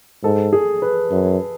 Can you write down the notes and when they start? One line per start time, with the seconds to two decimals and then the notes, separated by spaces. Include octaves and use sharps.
0.23 G#2 A4
0.53 G#4
0.82 B4
1.11 F#2